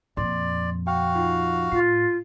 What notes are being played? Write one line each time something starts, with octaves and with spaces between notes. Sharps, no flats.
F2 A#2 D5 C6
F#4 F5 G5
D#4 F4
A2 F4 C7